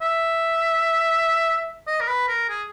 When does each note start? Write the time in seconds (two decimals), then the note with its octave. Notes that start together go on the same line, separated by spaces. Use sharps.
0.01 E5
1.87 D#5
2.01 A#4
2.08 B4
2.28 A#4
2.49 G#4